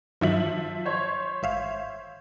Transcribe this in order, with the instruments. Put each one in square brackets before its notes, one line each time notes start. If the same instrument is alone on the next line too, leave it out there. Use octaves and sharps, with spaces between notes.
[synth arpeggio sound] G2 D#3 F#3 [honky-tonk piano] F3 E5 F#7
[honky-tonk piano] C5 C#5
[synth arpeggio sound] G#1 E5 F5